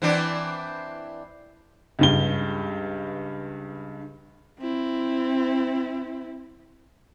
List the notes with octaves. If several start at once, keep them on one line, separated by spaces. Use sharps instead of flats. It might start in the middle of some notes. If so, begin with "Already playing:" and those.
E3 C4 D4
C#2 G2 G7
C4 E4